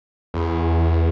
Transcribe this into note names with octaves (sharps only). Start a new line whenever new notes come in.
E2